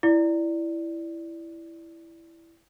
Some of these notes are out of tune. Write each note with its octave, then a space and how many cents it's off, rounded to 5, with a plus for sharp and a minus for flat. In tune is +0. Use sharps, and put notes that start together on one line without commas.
E4 +10 D5 +0